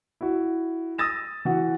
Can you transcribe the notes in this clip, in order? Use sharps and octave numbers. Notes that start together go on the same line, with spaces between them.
E4 F#4
D#6 E6 A6 A#6 E7
E3 F#4 F#5